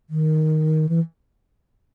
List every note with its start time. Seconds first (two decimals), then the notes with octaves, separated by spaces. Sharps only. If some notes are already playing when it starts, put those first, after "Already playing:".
0.10 D#3
0.89 E3